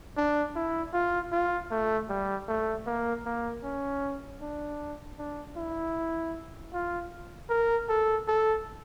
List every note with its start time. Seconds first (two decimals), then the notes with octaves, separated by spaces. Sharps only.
0.17 D4
0.56 E4
0.93 F4
1.32 F4
1.71 A3
2.09 G3
2.48 A3
2.86 A#3
3.25 A#3
3.63 C#4
4.41 D4
5.18 D4
5.57 E4
6.73 F4
7.50 A#4
7.89 A4
8.28 A4